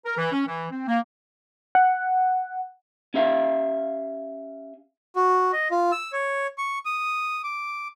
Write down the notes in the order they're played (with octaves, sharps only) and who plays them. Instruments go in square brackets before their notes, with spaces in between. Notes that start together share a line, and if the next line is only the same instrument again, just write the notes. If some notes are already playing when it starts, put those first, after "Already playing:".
[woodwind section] A#4
E3
C#4
E3
C4
A#3
[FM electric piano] F#5
[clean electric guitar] C#4 G4 E5 F5
[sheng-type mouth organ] F#4
D#5
F4
E6
C#5
C#6
D#6
D6